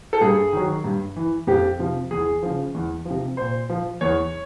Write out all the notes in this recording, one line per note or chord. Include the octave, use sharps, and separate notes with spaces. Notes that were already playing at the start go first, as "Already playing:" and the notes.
A4
G2 G#4
D#3 F#3
G2
E3
F2 G4
C3 F3
E2 G#4
C#3 F3
E2
F3
C3
A#2 C5
F3
E2 C#5